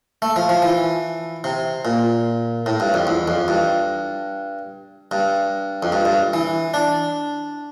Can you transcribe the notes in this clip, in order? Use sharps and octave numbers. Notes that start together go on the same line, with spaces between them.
A3
F3
F3
E3
C3
A#2
A2
G2
F2
E2
F2
G2
G2
F2
G2
G2
E3
D4